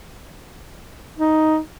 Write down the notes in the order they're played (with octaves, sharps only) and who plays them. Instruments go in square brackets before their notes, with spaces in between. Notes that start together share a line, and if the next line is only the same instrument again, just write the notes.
[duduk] D#4